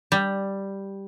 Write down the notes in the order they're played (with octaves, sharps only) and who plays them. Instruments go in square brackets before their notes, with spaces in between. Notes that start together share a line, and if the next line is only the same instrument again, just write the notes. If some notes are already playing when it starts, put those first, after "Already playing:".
[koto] G3